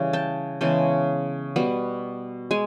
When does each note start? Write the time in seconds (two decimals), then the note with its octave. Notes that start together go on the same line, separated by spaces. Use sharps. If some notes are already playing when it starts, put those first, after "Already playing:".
Already playing: C#3 E3 G3
0.13 G5 A5
0.61 C#3 E3 G#3 B3 G5 A5
1.56 B2 G3 B3
2.51 G#3 G#5